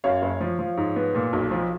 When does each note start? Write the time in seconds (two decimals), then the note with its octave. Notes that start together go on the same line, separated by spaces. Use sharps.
0.04 F#2 C#5 F5
0.22 F#1
0.41 F3
0.59 F3
0.77 G#2
0.96 B3
1.15 A#2
1.33 B1
1.51 F3